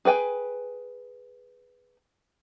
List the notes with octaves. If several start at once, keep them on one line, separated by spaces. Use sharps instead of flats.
G#4 B4 G5 G#5